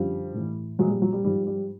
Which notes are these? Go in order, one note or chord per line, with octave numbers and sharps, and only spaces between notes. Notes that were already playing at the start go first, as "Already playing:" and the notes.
Already playing: F#2 D3 F3 G3
A2 E3
A#2 F3 F#3 G#3
G3
F#3
G3
G#2 F3 G3
G3